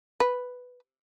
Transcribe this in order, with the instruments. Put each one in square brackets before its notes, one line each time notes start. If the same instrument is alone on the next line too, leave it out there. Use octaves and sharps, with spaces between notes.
[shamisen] B4